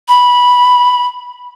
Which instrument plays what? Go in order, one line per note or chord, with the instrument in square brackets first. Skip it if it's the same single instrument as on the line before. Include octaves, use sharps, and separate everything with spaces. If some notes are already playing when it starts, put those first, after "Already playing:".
[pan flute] B5